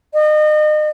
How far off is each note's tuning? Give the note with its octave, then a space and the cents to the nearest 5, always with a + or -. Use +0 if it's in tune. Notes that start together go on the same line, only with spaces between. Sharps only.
D#5 -35